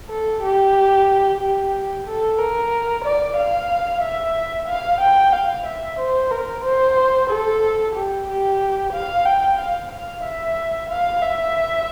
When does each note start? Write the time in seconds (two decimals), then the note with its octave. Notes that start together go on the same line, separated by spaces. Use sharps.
0.10 A4
0.43 G4
1.41 G4
2.07 A4
2.38 A#4
3.04 D5
3.37 F5
4.02 E5
4.68 F5
5.01 G5
5.33 F5
5.66 E5
5.99 C5
6.31 A#4
6.64 C5
7.29 A4
7.95 G4
8.28 G4
8.93 F5
9.25 G5
9.59 F5
9.91 F5
10.24 E5
10.90 F5
11.22 E5